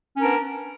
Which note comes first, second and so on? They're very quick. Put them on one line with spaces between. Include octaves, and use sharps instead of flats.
C#4 A#4 D4 B3